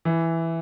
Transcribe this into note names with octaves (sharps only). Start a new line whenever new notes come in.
E3